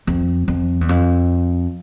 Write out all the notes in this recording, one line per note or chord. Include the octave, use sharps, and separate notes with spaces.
F2
F2
E2
F2